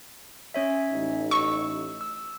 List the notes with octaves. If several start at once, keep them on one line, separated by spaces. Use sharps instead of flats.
C#4 C#5 E5
A1 D#4
C#6 E6
E6